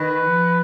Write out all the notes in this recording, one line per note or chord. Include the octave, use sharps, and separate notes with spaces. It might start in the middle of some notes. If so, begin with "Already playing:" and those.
Already playing: D#3 B4
F3